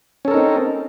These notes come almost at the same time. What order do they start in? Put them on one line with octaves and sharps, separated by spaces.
C#4 A4 A#4 D#4 C4